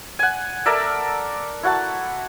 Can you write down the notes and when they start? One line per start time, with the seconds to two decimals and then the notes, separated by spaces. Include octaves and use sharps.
0.19 F#5 G#5
0.66 A4 A#4 D5 E5
1.63 E4 F#4 F#5 A5